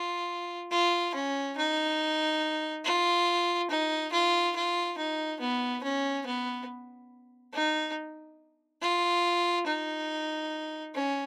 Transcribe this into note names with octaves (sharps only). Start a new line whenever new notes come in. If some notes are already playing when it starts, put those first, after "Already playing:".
Already playing: F4
F4
C#4
D#4
F4
D#4
F4
F4
D#4
B3
C#4
B3
D#4
F4
D#4
C#4